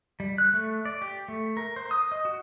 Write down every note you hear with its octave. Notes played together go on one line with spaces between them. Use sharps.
G3
F#6
A3
D5
G4
A3
A#4
C5
D#6
D#5
F#4